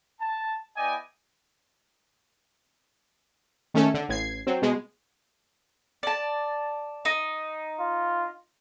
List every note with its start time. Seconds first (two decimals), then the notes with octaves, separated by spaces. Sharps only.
0.21 A5
0.77 B3 E4 D5 D#5 G5 G#5
3.74 D#3 A3 C#4 A4
3.94 D3
4.09 A1 G#6 C7
4.47 F#3 C4
4.62 B2 G#3
6.03 D5 A5
7.05 D#4
7.80 F4